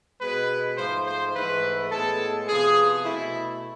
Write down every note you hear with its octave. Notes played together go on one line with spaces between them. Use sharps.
B2 G#3 B3 B4
G#2 F3 A3 C5
C5
G#2 E3 A3 B4
A2 G#3 B3 A4
C3 F3 B3 G#4
B2 A3 E4